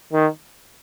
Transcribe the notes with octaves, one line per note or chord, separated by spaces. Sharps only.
D#3